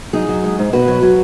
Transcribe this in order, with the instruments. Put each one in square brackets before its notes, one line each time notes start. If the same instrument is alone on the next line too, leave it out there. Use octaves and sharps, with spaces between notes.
[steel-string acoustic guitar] F#3 D#4 G#4
F#3
G#3
G#2
B2 F#4 B4
F#3
F#3